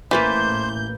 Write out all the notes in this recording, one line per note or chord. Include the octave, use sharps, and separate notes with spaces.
A1 E3 A#3 B4 C5 A5 G6